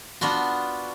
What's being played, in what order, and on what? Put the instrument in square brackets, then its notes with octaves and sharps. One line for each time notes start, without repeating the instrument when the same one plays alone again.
[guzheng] B3 D4 F4 F#4